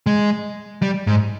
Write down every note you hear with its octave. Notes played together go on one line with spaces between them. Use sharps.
G#3
G3
G#2